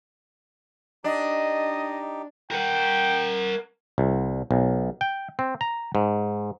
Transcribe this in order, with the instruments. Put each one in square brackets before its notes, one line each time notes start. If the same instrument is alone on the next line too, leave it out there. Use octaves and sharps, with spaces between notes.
[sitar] D4 [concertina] D#4 G4 [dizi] D#5
[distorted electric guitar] A#4 F#5 [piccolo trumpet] G5
[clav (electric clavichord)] C2
B1
G5
C4
A#5
G#2